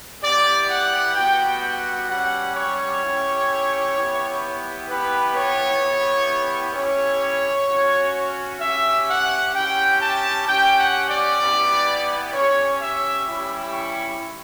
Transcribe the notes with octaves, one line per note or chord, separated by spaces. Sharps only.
B3 E4 G4 D5
F#5
G3 B3 F#4 G5
F#5
G3 C#4 G4 F#5
C#5
C#4 E4 G4
B3 E4 G4
B3 E4 G4 B4
C#5
B3 E4 G4
C#4 E4 G4 C#5
C#4 F#4
C#4 G4 E5
F#5
C#4 E4 G4 G5
A5
C#4 G4 G5
F#5
D5
B3 E4 G4
C#4 G4 C#5
E5
G3 C#4 E4 G4
C#6